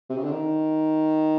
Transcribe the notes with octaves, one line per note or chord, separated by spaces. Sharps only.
C3
C#3
D3
D#3